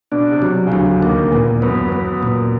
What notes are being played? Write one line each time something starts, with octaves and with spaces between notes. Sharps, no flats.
B2 D4
C3
F#3
C#3
D2 D3 F#3
D#2 D#3 A#3
E2 A#2 E3
F#2 F#3 B3
B3
A#2